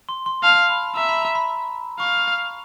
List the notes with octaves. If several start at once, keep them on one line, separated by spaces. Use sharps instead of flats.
C6
C6
F5 A5
B5
E5 A#5
B5
A#5
B5
F5 C#6